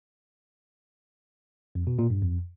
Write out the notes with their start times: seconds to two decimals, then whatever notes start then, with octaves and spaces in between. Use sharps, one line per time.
1.75 F2
1.87 B2
1.99 A#2
2.10 G2
2.22 F2